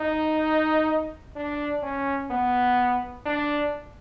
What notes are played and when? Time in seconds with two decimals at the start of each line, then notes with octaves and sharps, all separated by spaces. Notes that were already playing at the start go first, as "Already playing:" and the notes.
Already playing: D#4
1.36 D4
1.82 C#4
2.30 B3
3.25 D4